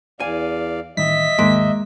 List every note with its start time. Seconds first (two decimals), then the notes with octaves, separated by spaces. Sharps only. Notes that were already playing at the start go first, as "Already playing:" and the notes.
0.20 E2 D5 F5 G#5
0.97 A1 D#3 G3 D#5 E5 B6
1.39 D#2 G#2 D#3 G#3 A#3